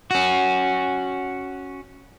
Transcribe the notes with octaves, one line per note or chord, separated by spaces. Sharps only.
C#4 F#4